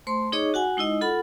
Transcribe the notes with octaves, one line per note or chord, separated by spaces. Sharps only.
A3 C5 C6
D#4 G#4 C#5 D#5 C#6 D6
F#4 F#5 G#5
G#3 D#4 E4 D#5
F4 A4 F#5 B5